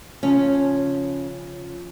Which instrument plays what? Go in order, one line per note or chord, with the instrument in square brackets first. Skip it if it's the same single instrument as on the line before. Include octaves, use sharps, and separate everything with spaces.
[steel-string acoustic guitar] C#3 F3 [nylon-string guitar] C#4